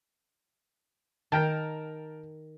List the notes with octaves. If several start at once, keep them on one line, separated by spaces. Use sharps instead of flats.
D#3 A#4 G5 A5